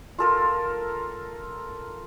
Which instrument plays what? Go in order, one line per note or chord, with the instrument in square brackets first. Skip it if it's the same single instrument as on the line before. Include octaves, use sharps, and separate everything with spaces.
[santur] F4 A4 A#4